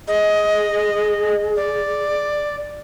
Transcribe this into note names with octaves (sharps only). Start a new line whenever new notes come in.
G#4 D#5
D5